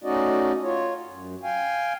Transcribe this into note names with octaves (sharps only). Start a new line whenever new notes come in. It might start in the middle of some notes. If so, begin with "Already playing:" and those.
A3 C#4 D#4 F#4 D5 D#5
F4 C#5
F#2
F5 G5 G#5